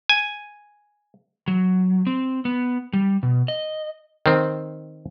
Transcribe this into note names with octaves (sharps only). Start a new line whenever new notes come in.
G#5
F#3
C4
B3
G3
B2
D#5
D#3 C4